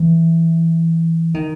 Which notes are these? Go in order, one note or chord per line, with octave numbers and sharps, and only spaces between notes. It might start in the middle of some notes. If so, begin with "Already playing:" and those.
Already playing: E3
D#3